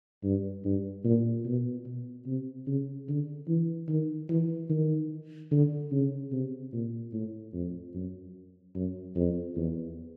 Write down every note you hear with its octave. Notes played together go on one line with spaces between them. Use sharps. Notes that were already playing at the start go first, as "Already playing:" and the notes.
G2
G2
A#2
B2
B2
C3
C#3
D3
E3
D#3
E3
D#3
D3
C#3
C3
A#2
A2
F2
F#2
F#2
F2
E2